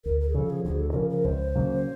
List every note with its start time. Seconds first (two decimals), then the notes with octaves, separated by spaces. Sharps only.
0.05 D2 A#4
0.20 A#4
0.29 G#4
0.35 C#3 F3 A4
0.50 G#4
0.65 D2 G#4
0.80 A4
0.91 A4
0.94 C#3 F3 A#4
1.10 A#4
1.24 C#2 C5
1.55 C#3 F#3 A#3